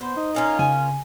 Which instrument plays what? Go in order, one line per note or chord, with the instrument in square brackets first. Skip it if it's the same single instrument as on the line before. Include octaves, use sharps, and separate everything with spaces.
[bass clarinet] B3 [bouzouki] C5
[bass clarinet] D#4
[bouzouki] A#3 C#4 F4 [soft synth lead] A#5
[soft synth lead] C#3 [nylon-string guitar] G#5